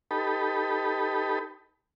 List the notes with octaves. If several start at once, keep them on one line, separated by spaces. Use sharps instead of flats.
D#4 G4 A4 B4 B5